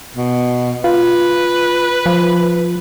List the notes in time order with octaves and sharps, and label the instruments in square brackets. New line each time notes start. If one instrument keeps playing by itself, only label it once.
[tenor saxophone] B2
[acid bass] F4 [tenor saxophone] B4
[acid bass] F3